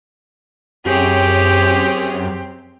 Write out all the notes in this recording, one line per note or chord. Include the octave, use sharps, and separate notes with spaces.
F#2 C4 G4 G#4 C#5